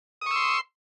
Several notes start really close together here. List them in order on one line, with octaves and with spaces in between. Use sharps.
D#6 C#6 E6 C6